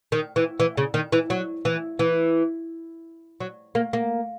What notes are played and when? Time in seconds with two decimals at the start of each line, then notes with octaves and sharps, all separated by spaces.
0.12 D#3
0.36 E3
0.60 E3
0.77 C#3
0.94 D#3
1.12 E3
1.30 F#3
1.65 E3
1.99 E3
3.40 F#3
3.75 A#3
3.93 A#3